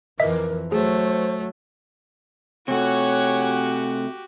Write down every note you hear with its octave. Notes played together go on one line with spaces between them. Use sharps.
F2 E3 A#4 D#5 E5 B6
F#3 A3 G#4 C5
C3 A3 F#4 G4 C#5 F#5 G#5